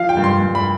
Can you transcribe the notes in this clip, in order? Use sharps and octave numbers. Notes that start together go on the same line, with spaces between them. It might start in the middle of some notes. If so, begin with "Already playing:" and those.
Already playing: F3 F5
G5
G2
C6
G2
B5